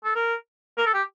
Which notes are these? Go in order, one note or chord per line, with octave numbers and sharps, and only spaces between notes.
A4
A#4
A#4
A4
G4